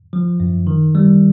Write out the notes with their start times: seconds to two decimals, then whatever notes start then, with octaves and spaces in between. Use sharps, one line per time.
0.13 F3
0.40 F#2
0.67 D#3
0.95 G3